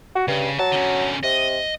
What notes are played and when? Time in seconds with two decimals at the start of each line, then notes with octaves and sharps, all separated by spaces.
0.15 F#4
0.28 G2 C#3
0.59 F#3 A5
0.72 D3 C#4
1.23 C3 D#5